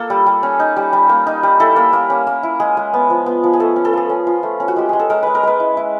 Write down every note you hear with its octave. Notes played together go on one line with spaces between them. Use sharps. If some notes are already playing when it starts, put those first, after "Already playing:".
Already playing: A#3 A4
G3
G3
C#4
D#4
G3
G3
A#3
D#4
G3
E4 A4
A#3
A#3
C#4
A#3
E4
G#3 G#4
G#3
B3
F3
B3
F3
G#4
A3 A4
C#4
A4
F4 G#4
C#4
F4
A3
C#4
F#4
G#3 G4
G#3 G#4
A4
G#3 A#4
G#3 B4
A#4
G#3 B4
E4
E4